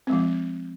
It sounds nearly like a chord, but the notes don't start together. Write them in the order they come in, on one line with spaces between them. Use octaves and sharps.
C4 G#3 F3